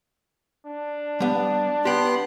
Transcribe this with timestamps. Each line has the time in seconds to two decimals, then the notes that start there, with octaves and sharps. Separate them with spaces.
0.66 D4
1.20 G3 B3
1.85 B3 G4 G5 C6 F#6